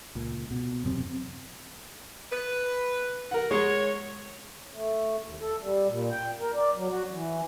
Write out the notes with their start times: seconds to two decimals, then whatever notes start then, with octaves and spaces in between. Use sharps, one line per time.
0.15 C#2 A#2
0.51 B2
0.84 E1 F#2 C3 C4
2.32 B4
3.31 A#4 F#5
3.51 G#3 C#5
4.73 A3
5.25 D#2
5.41 A4
5.62 G3
5.88 A#2
6.11 G5
6.40 A#4
6.54 D5
6.75 F#3
6.89 F#4
7.11 E3